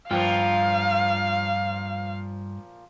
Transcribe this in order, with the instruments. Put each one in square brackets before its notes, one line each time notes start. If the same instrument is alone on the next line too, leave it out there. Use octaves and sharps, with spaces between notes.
[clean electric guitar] G2 F4 G5 [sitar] A#2 F3 [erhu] F5